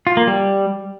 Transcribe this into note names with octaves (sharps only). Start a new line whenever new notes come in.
F4
A#3
G3